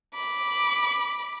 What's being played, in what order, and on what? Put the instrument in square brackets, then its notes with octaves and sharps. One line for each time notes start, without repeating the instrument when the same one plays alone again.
[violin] B5 D6